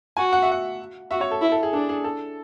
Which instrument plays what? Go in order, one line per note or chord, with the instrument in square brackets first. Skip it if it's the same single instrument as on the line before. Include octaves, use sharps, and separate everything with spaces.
[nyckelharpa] F#4 [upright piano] G#5
[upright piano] F#5
E5
F#5
[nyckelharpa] F#4 [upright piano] E5
[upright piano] C#5
A4
[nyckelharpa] E4
[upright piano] A4
G#4
[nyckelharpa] D4 [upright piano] A4
[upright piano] G#4
A4